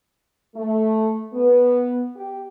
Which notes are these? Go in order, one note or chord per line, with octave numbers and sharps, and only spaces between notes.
A3
B3
G4